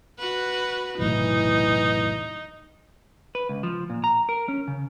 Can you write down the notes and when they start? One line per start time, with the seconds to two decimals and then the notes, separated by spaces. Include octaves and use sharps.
0.19 F#4 B4
0.99 F1 B1 A2 E3 D#4
3.35 B4
3.49 C#2
3.63 F3
3.90 A#2
4.04 A#5
4.29 A#4
4.48 C#4
4.68 C#3